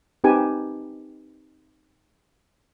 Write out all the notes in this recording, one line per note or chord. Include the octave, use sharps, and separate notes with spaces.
C4 D#4 G4 B4 G#5 A5